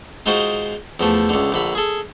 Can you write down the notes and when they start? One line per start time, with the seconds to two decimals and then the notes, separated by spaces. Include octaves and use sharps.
0.26 G#3 D#4 F4 F#4 C5
1.00 E2 F3 A3
1.30 C#2 D3
1.52 A#1 D3 B5
1.75 G#4 A4